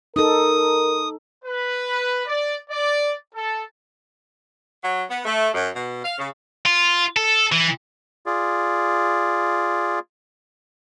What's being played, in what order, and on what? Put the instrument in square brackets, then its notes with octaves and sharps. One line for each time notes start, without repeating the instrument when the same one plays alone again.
[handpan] D#4 A4 [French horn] A#4 [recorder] D#6
[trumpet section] B4
D5
D5
A4
[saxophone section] F#3
B3
A3
F#2
B2
F5
C#3
[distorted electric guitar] F4
A4
E3
[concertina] F4 G#4 D5